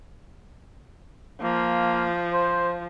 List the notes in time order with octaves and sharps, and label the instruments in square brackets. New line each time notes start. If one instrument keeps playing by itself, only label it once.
[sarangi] F3 [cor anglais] A#3
[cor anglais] C5